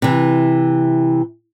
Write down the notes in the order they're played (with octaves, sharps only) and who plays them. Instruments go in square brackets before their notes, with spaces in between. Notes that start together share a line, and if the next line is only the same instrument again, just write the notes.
[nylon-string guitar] C3 E3